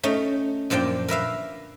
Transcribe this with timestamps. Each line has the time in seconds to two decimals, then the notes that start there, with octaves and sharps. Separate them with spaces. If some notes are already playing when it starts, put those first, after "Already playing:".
0.03 A3 C#4 D#4
0.70 F#2 A#2 F3 D4 G5
1.08 A#4 B4 E5 F5